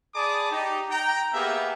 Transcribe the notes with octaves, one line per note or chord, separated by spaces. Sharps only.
G#4 D5 A5 B5 D6 D#6
D#4 G4
G5 A#5
A#3 B3 G4 G#4 E5 F5